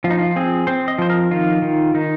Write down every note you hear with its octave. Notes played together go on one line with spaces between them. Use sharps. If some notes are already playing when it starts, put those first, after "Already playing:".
F3 F4
D#4
F4
C4 G#4
C4 C5
D#5
F3 C5
A#4
D#3 F4
D#3
D#3 D#4